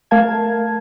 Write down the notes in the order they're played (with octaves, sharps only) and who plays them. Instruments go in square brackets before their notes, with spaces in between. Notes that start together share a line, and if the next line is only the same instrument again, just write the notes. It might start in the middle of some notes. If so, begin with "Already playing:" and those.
[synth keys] A3 A#4 F5 A5 G#6